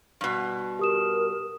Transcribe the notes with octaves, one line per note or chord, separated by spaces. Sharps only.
G2 B2
G4 A#4 D#6 E7